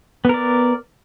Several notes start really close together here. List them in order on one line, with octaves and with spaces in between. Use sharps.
B3 A#4 D5